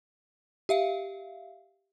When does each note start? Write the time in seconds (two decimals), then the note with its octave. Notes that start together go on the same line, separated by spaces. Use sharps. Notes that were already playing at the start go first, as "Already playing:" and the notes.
0.69 G4 E5 F5